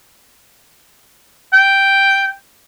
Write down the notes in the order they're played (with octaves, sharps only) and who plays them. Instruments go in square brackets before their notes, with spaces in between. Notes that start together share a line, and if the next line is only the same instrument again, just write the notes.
[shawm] G5